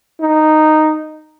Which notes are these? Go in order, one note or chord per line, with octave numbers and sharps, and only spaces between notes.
D#4